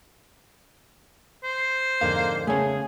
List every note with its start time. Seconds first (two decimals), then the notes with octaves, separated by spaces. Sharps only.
1.44 C5
2.01 F2 G#2 D3 A#3 F5
2.47 C#3 A3 B3 G#4 C#5